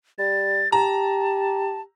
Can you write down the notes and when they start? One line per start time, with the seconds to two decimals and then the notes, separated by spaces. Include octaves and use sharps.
0.19 G3 A6
0.72 G4 A5 A#5